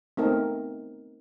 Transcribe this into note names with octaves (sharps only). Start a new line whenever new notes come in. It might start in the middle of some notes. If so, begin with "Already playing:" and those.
A3 B3 C4 D#4 A#4